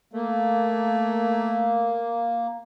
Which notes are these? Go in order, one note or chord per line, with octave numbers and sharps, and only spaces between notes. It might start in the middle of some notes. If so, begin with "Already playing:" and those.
A3 A#3